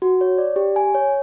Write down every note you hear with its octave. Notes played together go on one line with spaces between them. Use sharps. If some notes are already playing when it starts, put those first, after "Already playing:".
F#4
C#5
D5
G4
G#5
C#5